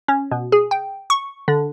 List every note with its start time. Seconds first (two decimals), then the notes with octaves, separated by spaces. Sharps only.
0.08 C#4
0.31 B2
0.52 G#4
0.71 G5
1.10 C#6
1.48 D3